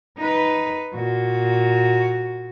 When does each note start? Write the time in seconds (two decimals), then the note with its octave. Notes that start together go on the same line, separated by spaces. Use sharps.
0.17 D#4 B4
0.94 A#2 F#4